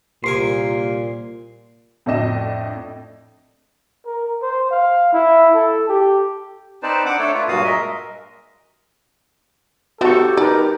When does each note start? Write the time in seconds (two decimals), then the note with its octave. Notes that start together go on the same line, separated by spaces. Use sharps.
0.24 C2 A#2 A#4 G#5 C6
2.06 F2 A2 D4 D#5 E7
4.06 A#4
4.42 C5
4.71 F5
5.13 E4
5.55 A4
5.89 G4
6.83 C4 D#4 B4 C5 D5 A5
7.06 D4 F#5 D6
7.19 A3 D4 A4 C#5
7.34 F4 B4
7.48 G2 A#2 F#3 F#4 F5 D#6
7.64 G#3 A#4 D#5 E5
10.01 B3 D#4 F#4 G4 A4 C5 C#6
10.37 D#4 A#4 B4 D5